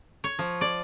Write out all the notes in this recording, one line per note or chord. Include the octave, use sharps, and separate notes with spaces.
C#5
F3
D5